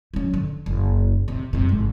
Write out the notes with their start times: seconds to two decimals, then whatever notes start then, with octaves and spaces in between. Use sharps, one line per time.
0.14 F#3 C#4
0.34 D3
0.66 F#1
1.28 C3
1.53 F#1 C3
1.69 G#1